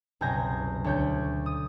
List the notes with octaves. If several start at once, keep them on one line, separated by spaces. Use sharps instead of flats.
F#1 C2 B2 G#5 G6 A#6
D2 C#5 G6
D#6